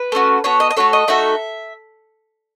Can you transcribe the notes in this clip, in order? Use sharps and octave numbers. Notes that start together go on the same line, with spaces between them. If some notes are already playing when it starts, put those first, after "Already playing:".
Already playing: B4
A3 C#4 F#4
B3 F#4 A4 C#5
D#5
D#5
A3 D#4 F#4 A4 C#5
D#5
A3 D#4 F#4 A4 E5